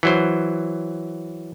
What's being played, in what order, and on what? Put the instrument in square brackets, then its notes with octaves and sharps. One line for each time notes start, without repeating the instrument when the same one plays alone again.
[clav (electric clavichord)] E3 F#3 C5